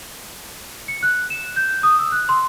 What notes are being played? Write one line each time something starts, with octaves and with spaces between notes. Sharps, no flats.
C#7
F#6
E7
G6
D#6
E6
F#6
C6